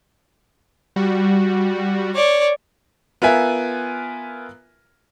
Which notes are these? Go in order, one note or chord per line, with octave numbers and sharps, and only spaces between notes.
G3 F#4
C#5 D5
B3 F4 A#4 E5 G#5